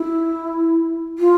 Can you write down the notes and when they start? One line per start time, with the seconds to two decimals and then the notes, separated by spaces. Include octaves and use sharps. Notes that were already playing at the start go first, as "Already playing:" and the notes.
Already playing: E4
1.18 F4